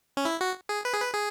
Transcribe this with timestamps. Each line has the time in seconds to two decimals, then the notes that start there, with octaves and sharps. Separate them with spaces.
0.17 C#4
0.25 E4
0.41 F#4
0.69 G#4
0.85 B4
0.93 G#4
1.00 B4
1.14 G#4